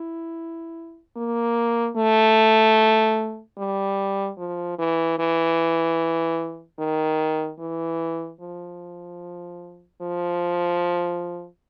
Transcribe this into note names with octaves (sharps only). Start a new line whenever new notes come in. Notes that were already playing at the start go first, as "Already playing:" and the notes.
Already playing: E4
A#3
A3
G3
F3
E3
E3
D#3
E3
F3
F3